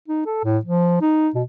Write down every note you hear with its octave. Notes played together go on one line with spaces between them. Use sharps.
D#4
A4
A2
F3
D#4
B2